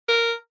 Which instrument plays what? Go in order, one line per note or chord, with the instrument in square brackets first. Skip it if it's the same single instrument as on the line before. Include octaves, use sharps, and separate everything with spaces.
[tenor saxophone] A#4